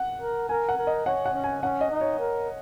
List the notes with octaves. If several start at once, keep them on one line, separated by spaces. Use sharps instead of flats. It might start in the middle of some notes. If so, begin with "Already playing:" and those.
Already playing: F#5
A#4
A#4 G#5
F#5
A#4
D#5
C#5 F#5
F#5
C#4
G#5
C#4 F#5
D#5
D#4
C#5
A#4